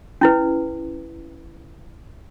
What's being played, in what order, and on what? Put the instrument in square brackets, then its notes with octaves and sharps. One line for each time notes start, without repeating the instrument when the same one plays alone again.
[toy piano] C#4 E4 B4